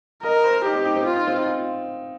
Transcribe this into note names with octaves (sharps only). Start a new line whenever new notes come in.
A#4 D#5
C5
D#4 G4
C4
D#4
C4
D#4 F4
D#4
C4
D#4
F4